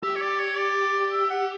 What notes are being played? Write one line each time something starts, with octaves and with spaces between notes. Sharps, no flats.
G4 E5
C#5
D5
C#5
D5
E5
F#5